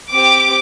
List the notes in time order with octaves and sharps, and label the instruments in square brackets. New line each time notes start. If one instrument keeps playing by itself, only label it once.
[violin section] C4 G4 D6